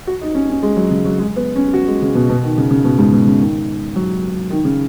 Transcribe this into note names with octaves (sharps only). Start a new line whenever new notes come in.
F#4
D#4
C#4
C#4
G#3
F#3
C#3
F#3
G#3
B3
C#4
F#4
G#3
C#3
B2
B2
D#3
C#3
C#3
B2
G#2
B2
C#3
D#3
F#3
D#3
C#3